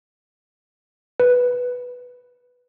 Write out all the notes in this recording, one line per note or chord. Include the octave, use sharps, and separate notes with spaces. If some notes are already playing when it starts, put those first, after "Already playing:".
B4